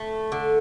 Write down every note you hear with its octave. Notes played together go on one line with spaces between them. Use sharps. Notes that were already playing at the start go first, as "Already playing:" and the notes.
Already playing: A3
D3